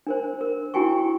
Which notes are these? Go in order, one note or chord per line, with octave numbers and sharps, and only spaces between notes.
D4 A#4 C5
A#4
D4 E4 F#4 G5 G#5 C#6